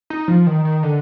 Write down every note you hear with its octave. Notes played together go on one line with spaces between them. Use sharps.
D#4
F3
D#3
D#3
D3